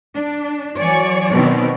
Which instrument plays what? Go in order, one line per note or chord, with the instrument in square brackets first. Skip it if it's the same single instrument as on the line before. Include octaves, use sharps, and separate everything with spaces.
[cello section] D4
[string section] E3 G#5 C#7 [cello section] F#3 C#5 D5
[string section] B2 D#3 C4